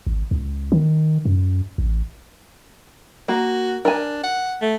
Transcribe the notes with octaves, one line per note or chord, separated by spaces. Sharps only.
G#1
C#2
D#3
F#2
A1
A#3 F#4
D4 A#4 G#5
F#5
A3